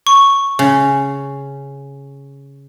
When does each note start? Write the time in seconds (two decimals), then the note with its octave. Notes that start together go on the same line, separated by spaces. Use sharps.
0.07 C#6
0.59 C#3